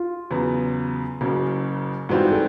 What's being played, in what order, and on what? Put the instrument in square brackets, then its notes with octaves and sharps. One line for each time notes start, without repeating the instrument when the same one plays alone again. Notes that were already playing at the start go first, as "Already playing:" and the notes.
Already playing: [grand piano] F4
[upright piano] E2 C#3 F#3 B3
F#1 F#2 C#3
[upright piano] G#2 E3 G3 C4 F4 [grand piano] F#4
[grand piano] A4